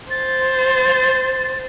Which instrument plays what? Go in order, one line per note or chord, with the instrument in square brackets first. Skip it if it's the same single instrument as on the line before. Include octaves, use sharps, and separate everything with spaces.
[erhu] C5 [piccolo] A6